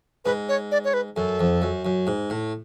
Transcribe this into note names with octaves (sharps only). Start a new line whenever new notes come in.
G#2 B4
C#5
D5
C#5
B4
F#2 A4
F2
F#2
F#2
G#2
A2